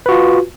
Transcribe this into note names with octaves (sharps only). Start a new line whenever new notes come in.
F4 F#4 B4